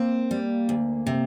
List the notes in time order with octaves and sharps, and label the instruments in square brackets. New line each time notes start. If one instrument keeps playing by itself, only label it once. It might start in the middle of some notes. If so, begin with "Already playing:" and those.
Already playing: [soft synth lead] A#3 [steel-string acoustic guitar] C4
[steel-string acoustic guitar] G3
D2
C3